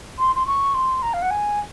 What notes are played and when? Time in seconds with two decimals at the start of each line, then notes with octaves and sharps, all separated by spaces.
0.19 C6
0.36 C6
0.47 C#6
0.75 C6
1.02 A#5
1.14 F5
1.22 F#5
1.31 G#5